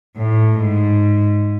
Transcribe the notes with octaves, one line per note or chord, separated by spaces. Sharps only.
A2
G#2